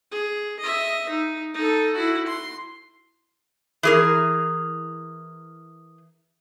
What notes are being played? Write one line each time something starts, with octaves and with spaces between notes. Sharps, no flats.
G#4
D#5 E5
D#4
D#4 A4
E4 F#4
C6
E3 G#4 A#4